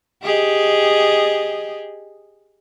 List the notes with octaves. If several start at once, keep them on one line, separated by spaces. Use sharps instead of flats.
G4 G#4 D#5